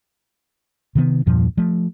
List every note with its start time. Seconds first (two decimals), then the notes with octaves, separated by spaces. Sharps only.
0.95 C3 D#3 B3
1.26 E2 G2 A#2 F3
1.57 F3 A3